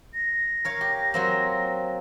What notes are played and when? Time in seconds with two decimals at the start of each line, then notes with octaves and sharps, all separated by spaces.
0.14 A#6
0.65 A#4 C#5 F5
0.81 G4
1.14 F#3 A#3 C4